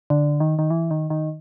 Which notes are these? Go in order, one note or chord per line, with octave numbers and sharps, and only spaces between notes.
D3
D#3
D#3
E3
D#3
D#3